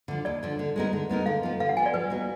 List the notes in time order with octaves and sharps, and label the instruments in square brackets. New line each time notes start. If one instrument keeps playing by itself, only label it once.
[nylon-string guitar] D3 F3
[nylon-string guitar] D#2 [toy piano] D5
[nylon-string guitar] D3 F3
D3
G#3 B3 D#4 A#4
D3
G#3 B3 D#4 A#4
[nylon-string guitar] D3 [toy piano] F5
[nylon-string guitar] F3 B3
[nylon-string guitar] D3 [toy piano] F5
[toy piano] F#5
[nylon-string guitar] F3 B3 [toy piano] G#5
[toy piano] D5
[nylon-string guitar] F3 [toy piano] B4
[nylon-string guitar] B3 D#4 F#4